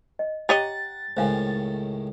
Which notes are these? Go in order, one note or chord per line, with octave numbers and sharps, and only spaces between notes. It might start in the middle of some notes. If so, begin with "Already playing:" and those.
D#5
G4 C#5 D#5 F#5 G5 A#5 A6
C#2 A2 D#3 C5 F5 G#5